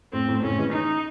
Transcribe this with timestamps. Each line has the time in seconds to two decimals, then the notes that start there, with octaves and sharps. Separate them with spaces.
0.13 A2 C4
0.28 A2
0.43 A2 C#3 C#4
0.58 E3 G#3
0.73 D#4